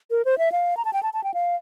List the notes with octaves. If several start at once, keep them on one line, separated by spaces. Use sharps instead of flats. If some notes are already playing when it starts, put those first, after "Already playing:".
A#4
C5
E5
F5
A#5
A5
G5
A5
A5
G5
F5